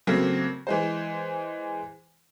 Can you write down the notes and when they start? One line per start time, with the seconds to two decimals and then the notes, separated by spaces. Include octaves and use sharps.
0.07 C#3 F#3 A3 A#3 C4
0.67 E3 G#3 C5